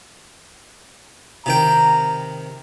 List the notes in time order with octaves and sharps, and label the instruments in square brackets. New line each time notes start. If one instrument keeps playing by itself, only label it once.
[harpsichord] C3 D#3 G5 [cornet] A#5